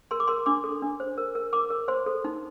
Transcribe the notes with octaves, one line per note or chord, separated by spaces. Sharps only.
A#4 C6
D6
A#4 C6
D4 D6
A4
D4
C5
A#4
A#4
A#4 D6
A#4
C5 C6
A4
D#4